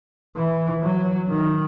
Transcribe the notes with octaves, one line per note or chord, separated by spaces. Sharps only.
E3
F#3
D#3